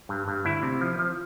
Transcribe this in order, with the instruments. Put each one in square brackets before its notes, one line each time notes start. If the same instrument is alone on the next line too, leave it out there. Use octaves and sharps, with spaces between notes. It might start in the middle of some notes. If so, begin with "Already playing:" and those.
[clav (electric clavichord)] G2
G2
D2 E4
C3
F3
F3